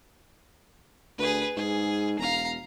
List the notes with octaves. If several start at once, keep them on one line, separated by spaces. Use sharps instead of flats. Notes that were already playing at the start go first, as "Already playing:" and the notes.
D2 G#4 B4
G#2 G#4
E1 F5 A#5